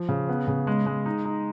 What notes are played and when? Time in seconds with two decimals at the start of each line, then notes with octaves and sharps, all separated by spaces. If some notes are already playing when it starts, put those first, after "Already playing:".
Already playing: F3
0.09 C#3
0.28 B3
0.48 C#3
0.67 G#3
0.86 G#3
1.06 D#4
1.25 D#4